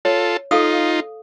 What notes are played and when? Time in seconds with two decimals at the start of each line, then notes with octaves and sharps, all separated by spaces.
0.05 F4 A4 C#5
0.51 D#4 F4 A4 F5 D#6